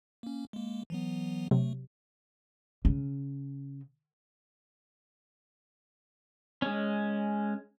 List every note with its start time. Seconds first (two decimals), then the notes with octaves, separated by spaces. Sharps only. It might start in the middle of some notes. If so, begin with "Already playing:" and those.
0.23 A#3 C#4
0.53 G#3 A#3
0.90 E3 F#3 B3
1.51 C3 F#3 A3
2.85 C#3 C#4
6.62 G#3 C#4